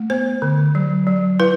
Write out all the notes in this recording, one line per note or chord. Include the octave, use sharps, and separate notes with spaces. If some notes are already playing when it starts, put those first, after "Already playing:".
Already playing: A3
B3 C5
D3
F#3
F#3
E4 B4